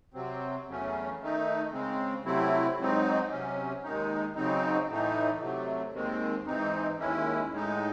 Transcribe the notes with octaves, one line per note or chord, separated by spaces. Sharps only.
C3 F#3 C4
E2 C#3 F#3 A3 C#4
D#3 A3 D#4
C#3 G#3 C4
C3 F#3 A3 C4 E4
G#2 F#3 C4 D#4
C3 F#3 C#4
D#2 D#3 G#3 D#4
C#3 F#3 C4 D#4
A2 E3 A3 D#4
C3 F#3 A3
D#2 D#3 G#3 C4
G#2 E3 C4 D#4
D#2 D#3 G#3 C#4 E4
A2 G#3 D#4